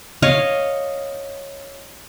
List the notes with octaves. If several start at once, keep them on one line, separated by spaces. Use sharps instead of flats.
C#5 D#5 F5